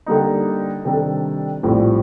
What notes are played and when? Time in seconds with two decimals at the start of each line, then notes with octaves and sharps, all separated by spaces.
0.06 D3 G3 A#3 D#4
0.85 C3 D#3 G3 D4 A4
1.63 A#1 A2 G3 C4 F4